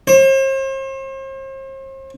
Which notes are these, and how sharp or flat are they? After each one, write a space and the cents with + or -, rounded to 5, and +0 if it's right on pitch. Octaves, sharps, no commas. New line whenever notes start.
C5 +40